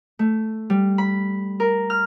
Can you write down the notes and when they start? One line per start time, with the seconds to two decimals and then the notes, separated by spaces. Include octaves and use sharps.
0.19 A3
0.70 G3
0.98 B5
1.60 A#4
1.90 F6